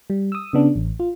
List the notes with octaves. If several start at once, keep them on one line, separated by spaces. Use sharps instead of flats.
G3
D#6 E6
C#3 B3 D4
A1
F4